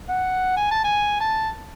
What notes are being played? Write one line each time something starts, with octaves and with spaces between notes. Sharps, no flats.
F#5
G#5
A5
G#5
A5